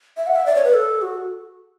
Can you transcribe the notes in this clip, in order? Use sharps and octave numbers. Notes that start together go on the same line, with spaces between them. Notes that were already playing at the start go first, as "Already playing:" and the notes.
E5
F#5
E5
D5
C#5
B4
A4
F#4